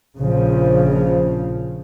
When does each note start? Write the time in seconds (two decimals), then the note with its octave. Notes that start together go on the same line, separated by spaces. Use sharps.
0.17 A#1 C#3 F3